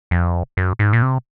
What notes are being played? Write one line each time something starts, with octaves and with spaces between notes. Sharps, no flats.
F2
F#2
G#2
A#2
C3